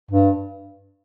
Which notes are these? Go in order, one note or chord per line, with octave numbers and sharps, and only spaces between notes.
G2